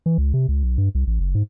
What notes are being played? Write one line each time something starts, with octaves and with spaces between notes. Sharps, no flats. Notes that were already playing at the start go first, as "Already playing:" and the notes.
E3
C#2
C3
C#2
B1
G2
C2
A1
F#1
G#2